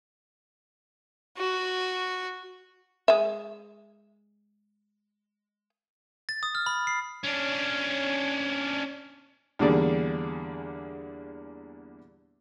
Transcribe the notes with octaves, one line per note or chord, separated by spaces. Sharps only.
F#4
G#3 E5
A6
D#6
F6
B5
C7
C#4 D4
E2 D3 G3 A#3 G#4 D5